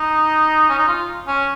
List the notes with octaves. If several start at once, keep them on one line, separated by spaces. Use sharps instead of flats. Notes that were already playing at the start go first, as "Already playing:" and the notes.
Already playing: D#4
C#4
D#4
F4
C#4